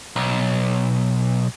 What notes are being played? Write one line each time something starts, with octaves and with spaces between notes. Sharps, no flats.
B1